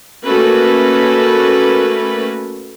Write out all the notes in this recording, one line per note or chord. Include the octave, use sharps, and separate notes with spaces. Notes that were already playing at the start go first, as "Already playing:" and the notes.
A3 A#3 C#4 F#4 A4 B4